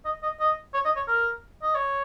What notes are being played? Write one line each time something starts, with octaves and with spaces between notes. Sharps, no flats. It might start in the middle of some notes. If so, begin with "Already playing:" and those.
D#5
D#5
D#5
C#5
D#5
C#5
A#4
D#5
C#5